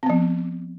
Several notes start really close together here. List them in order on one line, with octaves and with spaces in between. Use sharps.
C4 B3 F3